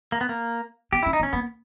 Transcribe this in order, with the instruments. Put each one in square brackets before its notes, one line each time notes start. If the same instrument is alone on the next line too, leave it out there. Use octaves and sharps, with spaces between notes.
[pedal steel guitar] A#3
B3
A#3
[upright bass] B3 [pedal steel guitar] G4
[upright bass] C#4 [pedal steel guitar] E4
[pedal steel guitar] D#4
[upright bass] B3
[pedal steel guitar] C#4
[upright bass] A#3 [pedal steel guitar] B3